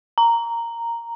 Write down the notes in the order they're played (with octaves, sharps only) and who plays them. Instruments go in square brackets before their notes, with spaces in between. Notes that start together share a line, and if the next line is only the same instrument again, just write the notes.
[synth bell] A#5